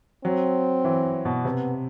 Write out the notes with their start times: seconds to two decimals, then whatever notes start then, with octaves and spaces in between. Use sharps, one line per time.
0.25 F#3 C4
0.85 E3
1.25 B2
1.45 C3 B3